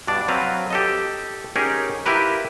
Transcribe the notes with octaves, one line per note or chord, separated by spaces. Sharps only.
G2 B2 D4 D5
F#3 C4 B4 F5
G4 A4 D#5
C#4 D#4 G4 G#4 A#4
E4 F4 G4 A#4 B4